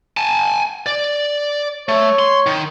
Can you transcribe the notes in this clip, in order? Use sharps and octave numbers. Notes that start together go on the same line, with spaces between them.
G#5 A5
D5
A3 C#5
C6
D#3